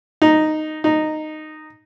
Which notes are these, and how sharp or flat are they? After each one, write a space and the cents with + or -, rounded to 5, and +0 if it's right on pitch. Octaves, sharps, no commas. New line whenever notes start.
D#4 -5
D#4 -10